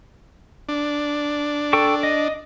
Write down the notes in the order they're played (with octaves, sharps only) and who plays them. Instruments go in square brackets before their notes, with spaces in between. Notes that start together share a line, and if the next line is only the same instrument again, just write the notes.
[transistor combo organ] D4
[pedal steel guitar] A4 G5 C#6
D#5